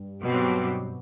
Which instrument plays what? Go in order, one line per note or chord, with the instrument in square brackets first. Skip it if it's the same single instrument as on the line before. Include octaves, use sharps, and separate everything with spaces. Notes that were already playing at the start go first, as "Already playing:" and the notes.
Already playing: [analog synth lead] G2
[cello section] B2 F#3 C4 G4